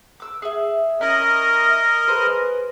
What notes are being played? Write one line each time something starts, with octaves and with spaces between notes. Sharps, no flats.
D6 E6
G#4 E5
C#4 E4 A#4 D#5
G#4 B4 C5